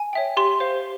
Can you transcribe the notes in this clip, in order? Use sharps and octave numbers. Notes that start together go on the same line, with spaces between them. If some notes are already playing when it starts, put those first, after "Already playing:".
Already playing: G#5
C#5 E5 G5
G4 C6
C5 F5